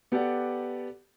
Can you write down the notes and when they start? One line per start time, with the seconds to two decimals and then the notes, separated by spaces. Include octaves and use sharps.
0.12 B3 G4 A4 D5 F#5